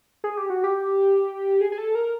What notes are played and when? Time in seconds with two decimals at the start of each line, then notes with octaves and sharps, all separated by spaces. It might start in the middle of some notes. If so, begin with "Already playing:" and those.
0.24 G#4
0.37 G4
0.50 F#4
0.64 G4
1.61 G#4
1.72 G#4
1.78 A4
1.95 A#4